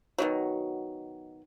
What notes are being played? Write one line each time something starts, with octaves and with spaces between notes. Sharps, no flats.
B2 D#3 F#3